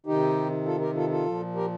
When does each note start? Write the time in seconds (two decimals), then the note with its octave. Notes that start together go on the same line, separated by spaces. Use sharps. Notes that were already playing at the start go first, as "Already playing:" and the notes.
0.06 C3 D#3 D#4 G4
0.65 F4 A4
0.80 G4 A#4
0.95 F4 A4
1.10 F4 A4
1.26 A#2 F3
1.55 G4 A#4